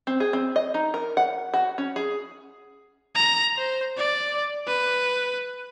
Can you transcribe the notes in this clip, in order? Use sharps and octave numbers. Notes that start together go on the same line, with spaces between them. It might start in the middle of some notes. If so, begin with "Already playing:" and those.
C4
G#4
C4
D#5
D#4
A#4
F#5
F#4
C#4
G#4
A#5
C5
D5
B4